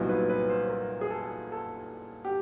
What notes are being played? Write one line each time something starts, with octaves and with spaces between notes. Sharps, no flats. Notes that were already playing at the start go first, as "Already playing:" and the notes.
Already playing: C2 A#2 F#3 B3 D#4
B4
B4
C5
A#4
G#4
A4
A4
G4